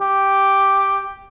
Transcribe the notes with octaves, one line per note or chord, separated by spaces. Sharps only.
G4